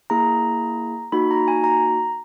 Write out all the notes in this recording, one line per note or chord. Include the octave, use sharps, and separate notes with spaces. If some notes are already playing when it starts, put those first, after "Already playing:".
A#3 E4 G#4 A#5
A#3 D#4 F#4 B5
A#5
G#5
A#5